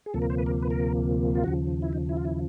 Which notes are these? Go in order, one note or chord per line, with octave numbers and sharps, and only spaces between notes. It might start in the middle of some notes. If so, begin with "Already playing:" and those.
G#4
D2 C3 F3 A#3 A4
A#4
C5
B4
A#4
B4
A#4
F4
D#2 C#3 F3 F#4
E4
D#4
E4
F4
E4